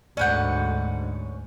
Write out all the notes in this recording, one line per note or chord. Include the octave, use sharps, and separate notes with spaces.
D2 G#2 C#4 B4 D5 F#5 G6